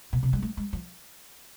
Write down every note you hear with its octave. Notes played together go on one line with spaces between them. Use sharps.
B2
C3
G#3
A3
G#3
F3